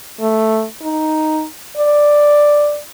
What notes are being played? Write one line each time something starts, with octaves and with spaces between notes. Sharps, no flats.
A3
D#4
D5